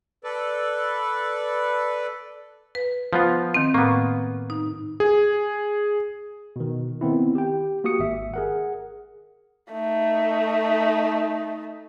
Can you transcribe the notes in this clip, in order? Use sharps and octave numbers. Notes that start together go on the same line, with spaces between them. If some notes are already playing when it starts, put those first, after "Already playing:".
A4 B4 D5
B4
F3 B3 F4
D#3 C4
A2 A#3 B3
D#4
G#4
B2 D#3
D#3 B3 C4 E4
G4 G5
A#3 F#4 G4 D#6 C#7
G#1 E5
G#4 A#4 F#5
A3 D#4